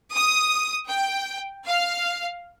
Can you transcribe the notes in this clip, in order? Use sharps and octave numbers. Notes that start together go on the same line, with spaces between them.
D#6
G5
F5